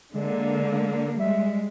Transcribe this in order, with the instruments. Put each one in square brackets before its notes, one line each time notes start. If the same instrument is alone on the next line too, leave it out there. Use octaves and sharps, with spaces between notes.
[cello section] D3 A#3 [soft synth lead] G#3
[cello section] G3 G#3 [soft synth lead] E5